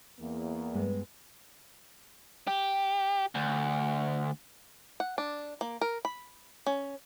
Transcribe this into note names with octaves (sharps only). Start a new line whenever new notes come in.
E2 A#3
G2 G#3 B3
G4
D2
F#5
D4
A#3
A#4
B5
C#4